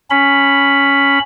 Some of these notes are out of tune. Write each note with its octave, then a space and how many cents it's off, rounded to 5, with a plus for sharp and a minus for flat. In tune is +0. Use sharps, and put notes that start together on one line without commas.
C#4 +0 B5 +0